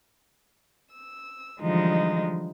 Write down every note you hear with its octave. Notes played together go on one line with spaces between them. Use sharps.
E6
D3 E3 F3 G3 G#3 D#4